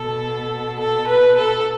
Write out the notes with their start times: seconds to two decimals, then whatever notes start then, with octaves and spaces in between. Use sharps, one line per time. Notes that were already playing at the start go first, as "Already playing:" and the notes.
Already playing: B2 A4
0.78 A4
1.08 B4
1.37 A4